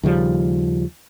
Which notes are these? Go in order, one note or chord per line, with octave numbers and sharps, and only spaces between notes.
D#2 C#3 F3 G3